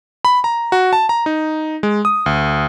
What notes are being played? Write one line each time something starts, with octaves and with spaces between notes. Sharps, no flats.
B5
A#5
F#4
A5
A#5
D#4
G#3
D#6
D2